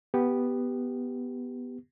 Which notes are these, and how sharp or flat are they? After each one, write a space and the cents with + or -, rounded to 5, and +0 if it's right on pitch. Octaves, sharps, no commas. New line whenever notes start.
B3 +0 G4 +0